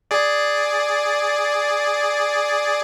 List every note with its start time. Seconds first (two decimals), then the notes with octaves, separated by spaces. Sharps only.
0.11 G#4 D5